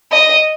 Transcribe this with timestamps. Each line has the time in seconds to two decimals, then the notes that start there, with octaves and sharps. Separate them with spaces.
0.12 D#5